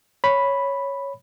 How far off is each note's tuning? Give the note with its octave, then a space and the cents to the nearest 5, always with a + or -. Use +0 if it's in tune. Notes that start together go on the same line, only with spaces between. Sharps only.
C#5 +0 B5 +0